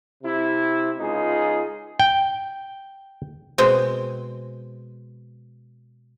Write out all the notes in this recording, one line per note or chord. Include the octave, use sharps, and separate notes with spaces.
C3 E4
C#2 D#4 F4 G#4
G5
B2 G#3 C4